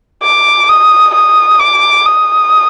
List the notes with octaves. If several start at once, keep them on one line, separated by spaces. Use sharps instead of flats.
D6
D#6
D#6
D6
D#6